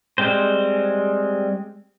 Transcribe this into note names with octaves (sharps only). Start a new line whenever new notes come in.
G3 G#3 C4 C5